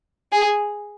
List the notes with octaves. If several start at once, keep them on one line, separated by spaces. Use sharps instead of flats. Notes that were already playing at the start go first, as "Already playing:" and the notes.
G#4